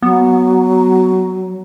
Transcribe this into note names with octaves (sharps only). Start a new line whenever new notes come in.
F#3 B3